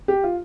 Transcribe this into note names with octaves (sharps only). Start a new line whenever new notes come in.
G4
F4